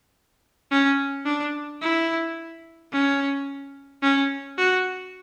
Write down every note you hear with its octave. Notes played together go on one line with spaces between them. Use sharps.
C#4
D4
E4
C#4
C#4
F#4